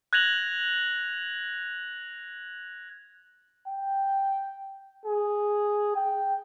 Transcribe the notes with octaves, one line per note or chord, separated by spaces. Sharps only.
F#6 G#6 A#6 F7 F#7
G5
G#4
G5